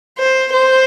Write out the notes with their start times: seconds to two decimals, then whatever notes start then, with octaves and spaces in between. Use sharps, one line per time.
0.19 C5
0.53 C5